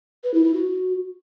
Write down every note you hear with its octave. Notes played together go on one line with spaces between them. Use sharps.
B4
E4
E4
F#4